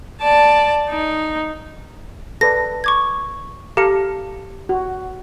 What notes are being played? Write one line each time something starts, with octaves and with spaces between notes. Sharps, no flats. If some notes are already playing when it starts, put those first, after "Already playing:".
D5 A5
D#4
A4 B4 D5 A#6
C#6 D6 G#6
G4 A4 F5 A#5 C#7
F#4